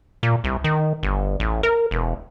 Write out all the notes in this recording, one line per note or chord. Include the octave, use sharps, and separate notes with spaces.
A#2
C2
D#3
G1
A1
A#4
E1